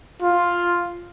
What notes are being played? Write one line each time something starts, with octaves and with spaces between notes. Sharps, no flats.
F4